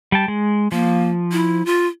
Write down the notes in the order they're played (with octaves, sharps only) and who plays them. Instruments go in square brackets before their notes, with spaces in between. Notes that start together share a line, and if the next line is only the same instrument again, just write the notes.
[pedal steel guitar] G3 G5 A5
G#3
[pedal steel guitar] F3 [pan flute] A#3
[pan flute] E4
F4